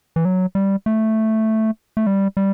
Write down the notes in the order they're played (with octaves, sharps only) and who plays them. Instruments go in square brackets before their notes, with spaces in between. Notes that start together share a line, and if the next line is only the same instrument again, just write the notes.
[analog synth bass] E3
F#3
G3
A3
A3
G3
G3